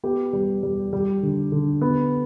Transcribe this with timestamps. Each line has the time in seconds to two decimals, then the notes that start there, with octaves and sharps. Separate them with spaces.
0.04 B3 G4
0.33 G3
0.63 G3
0.93 G3
1.23 D3
1.52 D3
1.81 B3